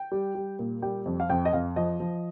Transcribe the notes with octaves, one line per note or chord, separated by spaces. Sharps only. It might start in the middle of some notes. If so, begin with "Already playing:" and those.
Already playing: G5
G3
G3
A#2
G3 G5
F2
F5
F2 G5
D#5
F2 F5
F3 D#5
F3